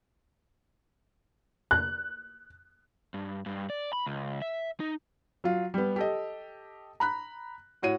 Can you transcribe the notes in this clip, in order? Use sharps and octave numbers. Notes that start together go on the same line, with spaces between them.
F#6
G2
G2
D5
B5
C#2
E5
D#4
F#3 F4
G3 B3
G4 A4 D#5
A#5 B5 F#6
A2 F#4 C#5 D#7